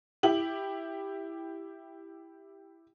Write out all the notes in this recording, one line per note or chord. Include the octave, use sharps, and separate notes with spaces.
E4 G4 F#7